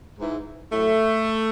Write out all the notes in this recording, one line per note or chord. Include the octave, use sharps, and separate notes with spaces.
G#2 E3
A2 F#3 A3